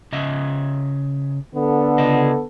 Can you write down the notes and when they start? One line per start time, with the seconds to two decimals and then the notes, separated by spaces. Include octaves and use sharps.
0.12 C#3 D#5 E5
1.56 D3 B3 A4
1.98 C#3 D#5